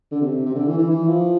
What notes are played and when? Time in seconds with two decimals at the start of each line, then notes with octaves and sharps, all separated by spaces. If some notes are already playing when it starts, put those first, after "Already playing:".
0.12 D3
0.21 C3
0.46 C3
0.55 D3
0.67 E3
0.79 E3
0.91 E3
1.08 F3